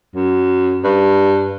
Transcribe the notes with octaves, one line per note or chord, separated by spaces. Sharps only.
F#2
G2